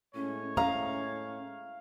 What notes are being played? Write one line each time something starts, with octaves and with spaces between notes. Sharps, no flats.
A2 G#3 C#4 C#5
C#4 F5 A#5